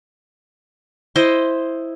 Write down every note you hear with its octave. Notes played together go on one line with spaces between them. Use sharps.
E4 C5 D#5